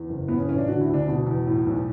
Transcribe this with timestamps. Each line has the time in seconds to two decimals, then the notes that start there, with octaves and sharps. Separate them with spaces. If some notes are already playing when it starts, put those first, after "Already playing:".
Already playing: E2
0.09 F#1
0.28 A2 B3
0.38 C#4
0.48 A1 C#4
0.58 D4
0.68 D3 F#4
0.81 E4
0.88 D2
0.94 D4
1.08 B2
1.27 E2
1.46 A2
1.66 B1